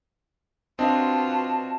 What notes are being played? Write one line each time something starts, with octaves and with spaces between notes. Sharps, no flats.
C4 D4 F4 F#4 B4 D#5 A5